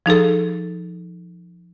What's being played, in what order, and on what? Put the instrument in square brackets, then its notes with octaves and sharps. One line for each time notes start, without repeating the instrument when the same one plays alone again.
[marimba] F3 D#4 G#4 A4